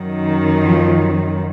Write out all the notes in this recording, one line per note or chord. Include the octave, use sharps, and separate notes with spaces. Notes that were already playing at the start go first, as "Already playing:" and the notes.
Already playing: F#2 D#3
F3